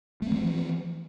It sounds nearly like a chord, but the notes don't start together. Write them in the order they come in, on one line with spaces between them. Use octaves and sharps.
A3 C4 E3 F3